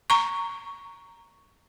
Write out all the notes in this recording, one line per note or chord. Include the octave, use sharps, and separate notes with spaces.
A#5 C#6